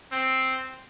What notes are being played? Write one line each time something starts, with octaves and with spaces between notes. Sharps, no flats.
C4